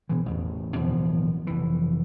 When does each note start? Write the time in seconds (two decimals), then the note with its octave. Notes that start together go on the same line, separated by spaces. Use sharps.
0.09 B2 E3
0.26 A1 E2
0.75 D1 B2 E3 F3
1.47 F1 E3